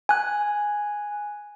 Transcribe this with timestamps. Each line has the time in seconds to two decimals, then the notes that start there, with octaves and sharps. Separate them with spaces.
0.09 G#5 F#6